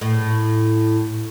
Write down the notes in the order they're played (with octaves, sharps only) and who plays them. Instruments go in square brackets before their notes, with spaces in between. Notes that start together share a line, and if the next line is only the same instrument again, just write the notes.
[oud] A2